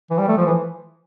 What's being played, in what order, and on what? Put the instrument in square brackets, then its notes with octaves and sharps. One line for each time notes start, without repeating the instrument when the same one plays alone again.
[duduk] E3
G3
A3
F3
E3